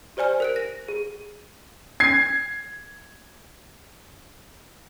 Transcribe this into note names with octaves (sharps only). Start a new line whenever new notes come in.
G4 C5 D5 G#5 F6
A#4 F#6 D7
A#6
G#4
G#6 C7